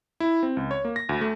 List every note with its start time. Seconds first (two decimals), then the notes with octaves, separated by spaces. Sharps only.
0.20 E4
0.43 C4
0.57 C#2
0.71 C#5
0.85 A#3
0.96 A#6
1.09 D2
1.21 A3